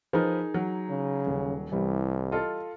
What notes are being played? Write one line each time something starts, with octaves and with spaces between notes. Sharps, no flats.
F3 D#4 G#4 A#4 B4
F#3
C#3
D#1
C2 E3 G3
F4 A4 D#5